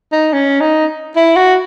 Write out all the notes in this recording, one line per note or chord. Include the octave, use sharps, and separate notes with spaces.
D#4
C#4
D#4
E4
F#4